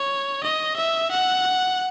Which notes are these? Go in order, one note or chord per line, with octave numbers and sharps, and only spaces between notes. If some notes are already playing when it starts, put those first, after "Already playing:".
Already playing: C#5
D#5
E5
F#5